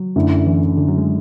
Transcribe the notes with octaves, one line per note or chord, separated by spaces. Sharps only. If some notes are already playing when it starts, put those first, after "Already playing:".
Already playing: F#3
F#2 D3 A3 E4
E3
D3
F#3
G#3